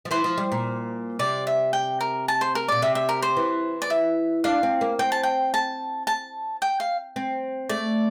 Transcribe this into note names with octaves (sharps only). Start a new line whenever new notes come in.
F3
E3 C5
F3
G3
A#2
C3 D5
E5
G5
A#4
A5
C5
A#4
A#2 D5
C3 E5
E5
A#4
C5
E3
D5
E5
D4 F5
C4
A#3
C4 G5
A5
G5
A5
A5
G5
F5
C4
A3 D5